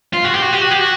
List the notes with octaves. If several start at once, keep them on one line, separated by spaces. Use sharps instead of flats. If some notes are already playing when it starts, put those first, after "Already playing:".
F4
F#4
G4
F#4
G4
F#4
G4
F#4